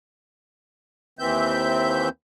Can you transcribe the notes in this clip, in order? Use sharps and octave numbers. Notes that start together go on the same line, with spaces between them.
D#2 E3 C4 E5 G6